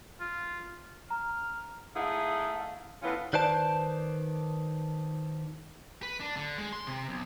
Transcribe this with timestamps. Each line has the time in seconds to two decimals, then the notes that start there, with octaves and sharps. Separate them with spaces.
0.20 F4
1.10 A#5 F6
1.95 A3 D#4 E4 G#4 F5 F#5
3.02 A2 E3 B3 C#4 F4
3.33 D#3 B4 C5 D5 A5
6.03 B4
6.20 D4
6.37 D3
6.58 G#3
6.73 C6
6.87 C3
7.09 B1